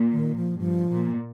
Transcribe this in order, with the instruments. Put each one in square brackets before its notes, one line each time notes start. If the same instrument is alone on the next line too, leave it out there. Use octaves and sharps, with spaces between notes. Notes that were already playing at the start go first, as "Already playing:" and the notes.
Already playing: [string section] A#2
[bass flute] D#3
F3
[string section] G2 [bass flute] F3
[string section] A#2